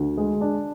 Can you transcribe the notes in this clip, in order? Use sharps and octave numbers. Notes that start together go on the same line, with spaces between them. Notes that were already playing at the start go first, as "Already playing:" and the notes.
Already playing: D2
G#3
D4